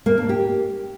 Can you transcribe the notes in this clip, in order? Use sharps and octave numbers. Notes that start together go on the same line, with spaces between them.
A#3
D4
G4